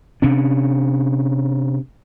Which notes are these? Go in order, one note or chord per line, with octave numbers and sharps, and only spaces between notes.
C3 C#4 D4